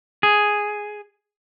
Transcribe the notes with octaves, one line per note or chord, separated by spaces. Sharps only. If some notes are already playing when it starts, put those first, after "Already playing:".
G#4